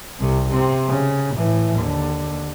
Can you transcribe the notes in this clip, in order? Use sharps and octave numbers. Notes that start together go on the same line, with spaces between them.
C2 C3
C3 C4
C#3
A2 E3
D#2 D3